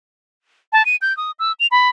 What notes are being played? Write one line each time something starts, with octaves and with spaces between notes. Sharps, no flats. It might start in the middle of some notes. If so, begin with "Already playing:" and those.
A5
D#7
G6
D#6
E6
F7
B5